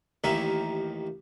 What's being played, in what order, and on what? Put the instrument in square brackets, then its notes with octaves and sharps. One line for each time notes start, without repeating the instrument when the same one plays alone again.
[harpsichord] A1 D#2 D#3 A#3 E5 G#5